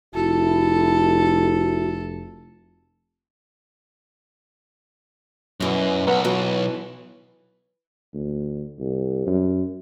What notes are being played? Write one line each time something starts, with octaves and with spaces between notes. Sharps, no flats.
F1 E4 F#4 A4
F#2 B2 E3
B1 B4 F#5 A#5
E3 F#4
D2
C2
F#2